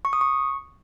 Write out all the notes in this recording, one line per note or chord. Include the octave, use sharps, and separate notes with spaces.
C#6
D#6
C#6